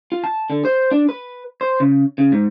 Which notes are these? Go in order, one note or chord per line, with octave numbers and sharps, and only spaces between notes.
F4
A5
D3
C5
D4
B4
C5
C#3
C#3
G#2